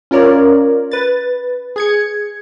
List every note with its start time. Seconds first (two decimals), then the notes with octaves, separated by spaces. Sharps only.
0.11 C#4 F4 A#4 C#5 D5
0.91 B4 A6
1.76 G#4 G#6 C#7